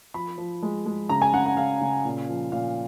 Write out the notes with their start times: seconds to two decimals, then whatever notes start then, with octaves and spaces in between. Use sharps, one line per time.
0.14 F3 B5
0.38 F3
0.63 G#3
0.86 G#3
1.09 C#3 A#5
1.22 G#5
1.33 C#3 F#5
1.46 F#5
1.57 C#3 F5
1.81 C#3
2.05 A#2
2.29 F3
2.52 A#2 F5